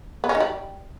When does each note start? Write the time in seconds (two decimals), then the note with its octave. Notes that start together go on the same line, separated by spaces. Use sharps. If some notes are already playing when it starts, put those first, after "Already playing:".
0.24 B3
0.29 C#4
0.35 D#3
0.40 G3